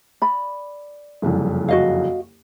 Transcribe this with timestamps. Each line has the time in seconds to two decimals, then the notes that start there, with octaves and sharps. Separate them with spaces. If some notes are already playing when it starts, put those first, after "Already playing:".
0.22 D5 B5
1.22 F#1 C2 F2
1.69 F#4 D#5 F5